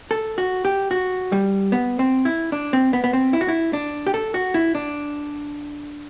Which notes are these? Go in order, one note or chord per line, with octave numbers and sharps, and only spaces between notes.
A4
F#4
G4
F#4
G3
B3
C4
E4
D4
C4
B3
B3
C4
E4
F#4
E4
D4
G4
A4
F#4
E4
D4